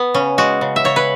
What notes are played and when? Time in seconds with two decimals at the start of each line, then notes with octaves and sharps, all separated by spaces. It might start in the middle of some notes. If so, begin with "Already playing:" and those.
Already playing: B3
0.14 C#3 C#4
0.38 G#3 F#4
0.61 C#3
0.76 E5
0.84 C#3 C#5
0.96 B4